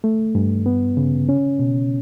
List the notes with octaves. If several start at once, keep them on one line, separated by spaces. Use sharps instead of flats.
A3
G2
B3
C#3
C#4
B2